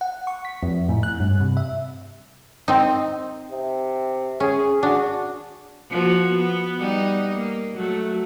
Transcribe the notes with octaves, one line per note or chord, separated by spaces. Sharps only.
F#5
C#6
B6
F2
A2
F#6
G2
C3
E5
C4 D#4
C3
C#4 G#4
D4 F#4
F3 A#3 F#4
B3
G3 B3 D#4
A#3
F#3 A3